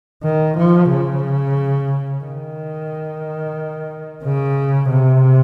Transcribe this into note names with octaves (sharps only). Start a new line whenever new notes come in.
D#3
F3
C#3
D#3
C#3
C3